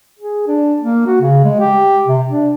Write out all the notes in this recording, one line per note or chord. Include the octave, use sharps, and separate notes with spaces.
G#4
D4
A#3
F#4
C#3
G#3
G4
C3
D4